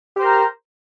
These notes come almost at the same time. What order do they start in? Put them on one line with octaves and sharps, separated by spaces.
G4 C5 A#4 A#5